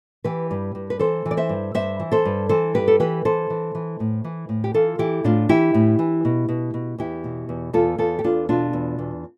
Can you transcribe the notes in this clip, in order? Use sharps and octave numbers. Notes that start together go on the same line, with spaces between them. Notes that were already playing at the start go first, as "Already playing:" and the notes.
E3 G4 B4
G2
G2
B4
E3 A4 C5
E3
D5
C5 E5
G2
G2 C5 E5
E3
A4 C5
G2
E3 A4 C5
G2 G4 B4
A4
E3 G4 B4
E3 A4 C5
E3
E3
A2
E3
A2
G4
E3 F4 A4
E3 E4 G4
A2 D4 F4
E3 E4 G4
A2
E3
B2
B2
B2
E2 E4 G4
B2
E2
E2 F4 A4
E2 F4 A4
G4
E2 D4 F4
B2 D4 F4
E2
E2